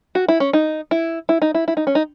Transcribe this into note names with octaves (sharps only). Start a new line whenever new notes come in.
F#4
E4
C#4
D#4
E4
E4
D#4
E4
E4
D#4
C#4
D#4